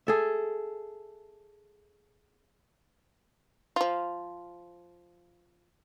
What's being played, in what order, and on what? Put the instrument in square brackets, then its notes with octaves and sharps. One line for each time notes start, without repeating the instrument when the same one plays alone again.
[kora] G#4 A4 E5
[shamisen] F3 F4